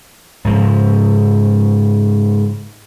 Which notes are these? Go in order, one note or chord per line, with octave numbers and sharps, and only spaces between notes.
G#2 C#3 F3